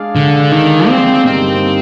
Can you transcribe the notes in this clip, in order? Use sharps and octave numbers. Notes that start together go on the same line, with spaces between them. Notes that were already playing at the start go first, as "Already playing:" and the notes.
Already playing: G#3 D4 G#4 D5 F5
D3
D#3
C4
G2 D3 G3 A#3 C4 D#4